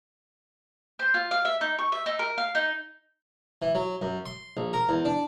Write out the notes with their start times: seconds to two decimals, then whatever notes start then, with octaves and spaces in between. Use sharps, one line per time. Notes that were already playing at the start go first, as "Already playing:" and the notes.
0.99 C5
1.14 F4
1.31 F5
1.45 E5
1.61 D#4
1.79 C#6
1.92 E5
2.06 D#4
2.19 A#4
2.38 F5
2.55 D#4
3.62 E3
3.75 F#3
4.02 F#2
4.26 C6
4.57 A#1
4.73 A#4
4.89 E2
5.05 D4